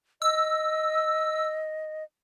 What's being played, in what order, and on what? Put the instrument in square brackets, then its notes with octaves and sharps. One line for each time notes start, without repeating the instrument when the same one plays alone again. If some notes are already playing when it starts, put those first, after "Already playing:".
[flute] D#5 [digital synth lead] E6